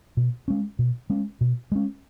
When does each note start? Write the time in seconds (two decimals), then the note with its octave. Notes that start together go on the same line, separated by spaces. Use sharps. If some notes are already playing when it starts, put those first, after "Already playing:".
0.17 B2
0.48 G#3 C#4
0.79 B2
1.10 G#3 C#4
1.41 B2
1.72 G#3 C#4